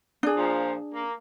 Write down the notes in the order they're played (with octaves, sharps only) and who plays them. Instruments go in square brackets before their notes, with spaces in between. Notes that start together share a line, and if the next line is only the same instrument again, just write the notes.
[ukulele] D4 G#4
[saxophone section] A#2 F3
A#3